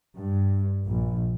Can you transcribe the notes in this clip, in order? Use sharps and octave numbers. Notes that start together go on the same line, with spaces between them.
G2
A#1